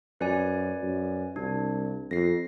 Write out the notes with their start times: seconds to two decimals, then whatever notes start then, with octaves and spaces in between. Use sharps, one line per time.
0.21 F#2 B4 D5 G#5
0.83 F#2
1.36 C2 D4
2.11 F2 A#6 C7